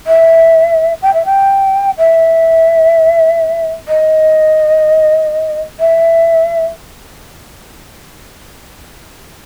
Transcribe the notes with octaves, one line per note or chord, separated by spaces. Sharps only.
E5
G5
E5
G5
E5
D#5
E5